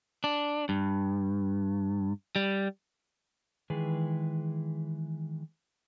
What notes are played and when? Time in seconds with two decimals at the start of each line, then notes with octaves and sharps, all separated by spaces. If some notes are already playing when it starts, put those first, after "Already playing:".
0.24 D4
0.69 G2
2.36 G3
3.70 D#3 E3 G#3 G#4 B4